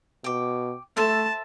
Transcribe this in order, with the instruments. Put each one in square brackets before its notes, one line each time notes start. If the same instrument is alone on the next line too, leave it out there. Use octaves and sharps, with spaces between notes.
[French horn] B2 [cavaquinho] G5 D6
[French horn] A3 [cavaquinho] A4 C5 E5 [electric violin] A5